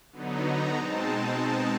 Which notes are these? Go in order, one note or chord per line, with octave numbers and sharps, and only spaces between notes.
D3 F#3 B3 D#4
A#5
B2 G#3 C4 D#4 A5